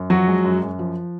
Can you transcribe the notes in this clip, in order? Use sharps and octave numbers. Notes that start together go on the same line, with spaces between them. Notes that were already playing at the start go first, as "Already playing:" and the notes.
Already playing: F#2
F3 F#3 F#4
G#3
F#2
F#2
F3